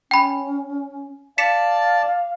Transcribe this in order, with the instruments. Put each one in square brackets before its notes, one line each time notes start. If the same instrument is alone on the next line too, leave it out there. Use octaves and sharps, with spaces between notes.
[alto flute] C#4 [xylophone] G5 B5
[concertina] D5 A5 [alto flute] F5 [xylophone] B6 C#7 E7